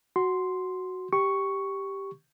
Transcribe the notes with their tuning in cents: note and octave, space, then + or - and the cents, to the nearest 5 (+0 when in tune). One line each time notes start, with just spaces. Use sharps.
F#4 +0 C6 +0
G4 +0 C#6 +0